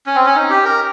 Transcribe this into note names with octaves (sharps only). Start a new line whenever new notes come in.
C#4
C4
C#4
D#4
G4
A#4